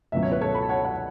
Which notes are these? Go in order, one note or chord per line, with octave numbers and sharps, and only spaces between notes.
C#2 B2 F#3 E5
C#5
B4
A4 C#5
B5
A5
C#5 F#5
C#5 F#5